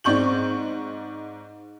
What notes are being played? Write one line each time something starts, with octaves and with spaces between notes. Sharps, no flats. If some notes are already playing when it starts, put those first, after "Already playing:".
G#2 C4 D5 C#6 G6 F#7